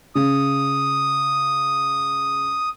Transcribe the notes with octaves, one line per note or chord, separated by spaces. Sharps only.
C#3 D#6